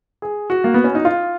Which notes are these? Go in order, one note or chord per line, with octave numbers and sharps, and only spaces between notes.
G#4
F#4
A#3
B3
C#4
D#4
F4